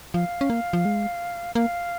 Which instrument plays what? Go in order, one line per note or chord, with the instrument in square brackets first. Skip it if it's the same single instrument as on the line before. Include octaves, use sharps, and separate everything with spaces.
[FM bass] F3 [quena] F5
[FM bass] C#4
A#3
F3
G#3
[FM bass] A#3 [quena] F5